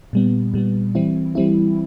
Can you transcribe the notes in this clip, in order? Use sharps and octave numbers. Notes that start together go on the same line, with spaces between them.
A#2 G3 B3
A#2 G3 B3
E3 G3 C4 E4
E3 G3 C4 E4